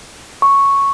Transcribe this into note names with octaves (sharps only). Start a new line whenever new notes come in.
C#6